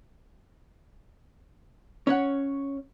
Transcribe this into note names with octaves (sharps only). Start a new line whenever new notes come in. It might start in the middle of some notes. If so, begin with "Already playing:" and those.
C#4 C#5 F#5